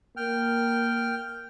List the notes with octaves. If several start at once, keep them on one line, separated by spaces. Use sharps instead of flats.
A#3 G5 F6